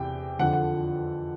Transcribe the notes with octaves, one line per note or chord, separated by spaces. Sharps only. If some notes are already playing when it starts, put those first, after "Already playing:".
Already playing: E2 C3 G5
F2 D3 F3 F#5
F#5